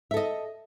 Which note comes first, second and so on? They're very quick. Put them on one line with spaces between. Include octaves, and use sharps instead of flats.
E5 A4 D#5